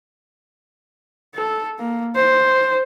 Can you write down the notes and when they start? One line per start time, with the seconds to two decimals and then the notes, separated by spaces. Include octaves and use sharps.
1.35 A4
1.79 A#3
2.16 C5